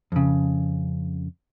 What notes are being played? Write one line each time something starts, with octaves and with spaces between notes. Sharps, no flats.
F2 C#3